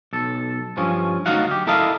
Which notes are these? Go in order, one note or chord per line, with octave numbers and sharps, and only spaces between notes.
B1 A4
G2 F3 C#4
D2 F#3 D#4 F#4 F5 F#5
G4
E4 A4 A#4 D#5 F5